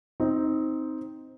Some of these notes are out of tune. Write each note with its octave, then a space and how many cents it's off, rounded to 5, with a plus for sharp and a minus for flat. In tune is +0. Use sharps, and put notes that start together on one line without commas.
C4 +0 D#4 +10